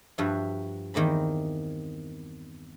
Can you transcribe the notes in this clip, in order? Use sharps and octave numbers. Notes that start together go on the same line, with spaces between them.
G2 F3 F#4 E5 F5
E2 D#3 A#3 C4 B5